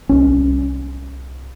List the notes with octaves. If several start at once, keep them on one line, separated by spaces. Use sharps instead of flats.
C2 C#4